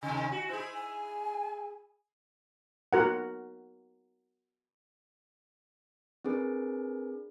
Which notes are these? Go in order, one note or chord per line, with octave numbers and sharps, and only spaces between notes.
D#2 C3 G#5
F#4
E4 G#4 C5
G#5
F#4 A#4 F#5
C4 D4 G#4 A#4 B4